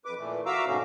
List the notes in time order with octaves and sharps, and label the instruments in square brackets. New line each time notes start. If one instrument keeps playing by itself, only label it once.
[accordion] F2 B4 D6
A#2 E3 A3
F#4 E5 F5 A#5 D6 E6
G#2 B2 D3 A3 C#4